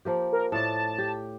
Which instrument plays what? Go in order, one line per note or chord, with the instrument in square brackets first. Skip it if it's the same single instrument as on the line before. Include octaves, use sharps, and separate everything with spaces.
[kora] F3 A#3 G4
[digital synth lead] A#4
[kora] A2 D5 [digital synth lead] A5
[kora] G4